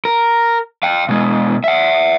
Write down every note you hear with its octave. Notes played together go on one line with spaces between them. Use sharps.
A#4
F5 G5
B2 G#3
E5 F#5